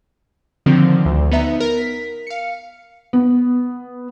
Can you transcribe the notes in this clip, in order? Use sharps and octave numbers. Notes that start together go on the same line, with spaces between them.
D3 D#3 F3 C4
D2
B3 D#4 E5 A#5
A#4
B6
F5 C#7
B3